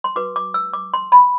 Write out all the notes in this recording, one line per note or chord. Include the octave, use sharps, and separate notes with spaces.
C6
F#4 B4 D6
D6
E6
D6
C6
B5